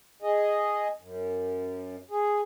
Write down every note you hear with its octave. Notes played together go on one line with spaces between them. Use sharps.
G#4 D#5
F#2
G#4